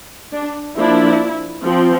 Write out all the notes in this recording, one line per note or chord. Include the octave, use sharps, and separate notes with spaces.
D4
F3 A#3 D4 E4
F3 C4